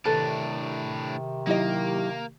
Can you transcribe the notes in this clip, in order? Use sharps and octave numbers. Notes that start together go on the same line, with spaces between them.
A2 C3 D#3 D4 A4 B4
F#3 A#3 D#4 E4 G4 D#5